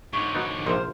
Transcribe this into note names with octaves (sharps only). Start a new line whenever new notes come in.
G#2 D3 C#5
F#3 B3 D#4
A#1 C3 C5 D#5 F5